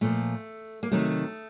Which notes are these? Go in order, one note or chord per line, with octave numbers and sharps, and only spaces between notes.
A#2 F3 A3
A#3
C3 D#3 F#3 A3